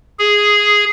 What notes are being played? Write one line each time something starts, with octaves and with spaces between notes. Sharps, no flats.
G#4